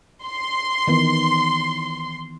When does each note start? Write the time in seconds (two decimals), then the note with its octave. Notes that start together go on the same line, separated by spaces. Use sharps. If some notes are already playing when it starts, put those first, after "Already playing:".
0.24 C6
0.87 D#3 E3 B3